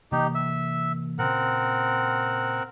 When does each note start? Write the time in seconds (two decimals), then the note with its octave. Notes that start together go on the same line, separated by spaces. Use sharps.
0.12 C3 E3 A#3 D#4 G4
0.35 E5
1.19 A#2 C#3 C4 A#4 F#5